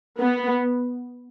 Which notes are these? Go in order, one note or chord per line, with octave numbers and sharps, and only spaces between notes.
B3